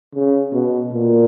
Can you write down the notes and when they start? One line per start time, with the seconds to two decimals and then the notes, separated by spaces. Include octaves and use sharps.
0.15 C#3
0.53 B2
0.92 A#2